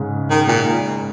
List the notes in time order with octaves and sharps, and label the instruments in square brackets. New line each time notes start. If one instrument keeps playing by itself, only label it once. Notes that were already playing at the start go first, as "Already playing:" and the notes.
Already playing: [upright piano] G#2 C#3
[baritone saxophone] D#3
A#2